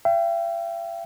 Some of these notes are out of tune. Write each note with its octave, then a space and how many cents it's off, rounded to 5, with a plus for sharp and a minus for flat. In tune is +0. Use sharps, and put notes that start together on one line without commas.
E5 +45 G5 -15